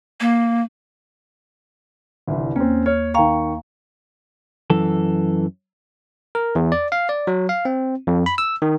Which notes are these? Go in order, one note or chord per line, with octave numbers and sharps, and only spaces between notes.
A#3
G1 C2 E3
D#2 A#3 C4 C#4
C#5 F6
D#3 F5 G5 A#5 C#6
F#2 E3 A4
A#4
E2
D5
F5
D5
F#3
F5
C4
F2
B5
E6
D#3